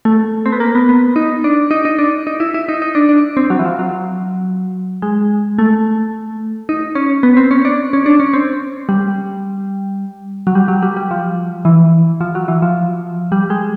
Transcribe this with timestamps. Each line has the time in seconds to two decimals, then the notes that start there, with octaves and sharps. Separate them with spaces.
0.05 A3
0.46 C4
0.52 B3
0.60 A#3
0.75 B3
0.89 B3
1.16 D#4
1.44 D4
1.71 D#4
1.85 D#4
1.99 D4
2.27 D#4
2.40 E4
2.54 E4
2.69 D#4
2.82 D#4
2.95 D4
3.09 D4
3.37 C4
3.50 F#3
3.59 E3
3.65 F3
3.79 F#3
5.02 G#3
5.58 A3
6.69 D#4
6.95 C#4
7.23 B3
7.37 C4
7.51 C#4
7.65 D4
7.93 C#4
8.06 D4
8.20 C#4
8.33 C4
8.89 G3
10.47 F#3
10.55 G3
10.68 F#3
10.82 G3
10.97 G3
11.11 F3
11.65 E3
12.21 F3
12.35 F#3
12.48 E3
12.62 F3
13.32 G3
13.50 G#3